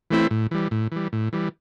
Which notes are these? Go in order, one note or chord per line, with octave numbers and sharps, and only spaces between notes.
E3 A3 C4 E4
A2
E3 G3
A2
E3 G3
A2
E3 G3